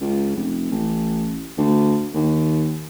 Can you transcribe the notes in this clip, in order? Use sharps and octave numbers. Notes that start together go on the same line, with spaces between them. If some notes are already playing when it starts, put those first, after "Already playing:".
C#2
F1
A1
D2
D#2